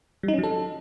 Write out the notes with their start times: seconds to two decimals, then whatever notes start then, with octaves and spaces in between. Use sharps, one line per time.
0.23 G3
0.28 D#4
0.33 C#4
0.39 F#3
0.44 A4